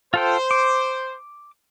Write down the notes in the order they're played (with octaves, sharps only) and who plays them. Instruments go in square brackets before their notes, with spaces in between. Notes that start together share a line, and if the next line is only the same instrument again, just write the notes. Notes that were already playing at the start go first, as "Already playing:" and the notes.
[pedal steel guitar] F4 A4 G5 [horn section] C5
[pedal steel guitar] D6